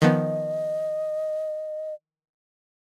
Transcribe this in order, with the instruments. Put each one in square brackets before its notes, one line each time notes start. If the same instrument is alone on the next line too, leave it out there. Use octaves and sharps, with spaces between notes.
[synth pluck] D#3 F3 B3 [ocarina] D#5